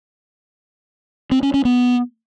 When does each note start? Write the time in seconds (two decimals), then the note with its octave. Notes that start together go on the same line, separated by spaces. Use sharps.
1.31 C4
1.43 C#4
1.54 C#4
1.65 B3